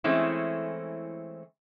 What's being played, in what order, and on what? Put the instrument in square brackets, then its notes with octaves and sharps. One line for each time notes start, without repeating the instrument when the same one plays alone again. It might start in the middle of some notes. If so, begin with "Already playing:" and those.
[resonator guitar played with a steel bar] E3 G#3 A3 C4 C#4 E4